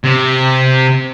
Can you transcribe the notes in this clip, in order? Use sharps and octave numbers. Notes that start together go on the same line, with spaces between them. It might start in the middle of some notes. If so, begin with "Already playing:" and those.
C3